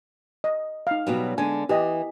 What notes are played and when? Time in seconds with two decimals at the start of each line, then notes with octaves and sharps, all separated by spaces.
0.44 D#5
0.87 D#4 F5
1.07 B2 F#3 G3
1.38 D3 G#3 G#5
1.69 E3 G4 D#5